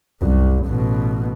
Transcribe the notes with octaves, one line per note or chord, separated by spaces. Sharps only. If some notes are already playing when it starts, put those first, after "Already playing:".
C2 F#2
A1 B2